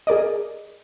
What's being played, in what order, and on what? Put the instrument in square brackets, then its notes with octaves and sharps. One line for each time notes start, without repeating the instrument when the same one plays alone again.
[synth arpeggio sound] G#4 A#4 D5 D#5